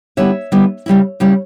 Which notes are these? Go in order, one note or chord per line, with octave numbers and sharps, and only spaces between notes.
D3 G3 B3 E4 C#5 E5
D3 G3 B3 E4
C#3 G3 C#4 E4
C#3 G3 C#4 E4